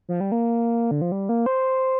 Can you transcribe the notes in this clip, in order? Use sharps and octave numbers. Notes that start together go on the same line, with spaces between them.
F3
G3
A#3
D3
F3
G3
A#3
C5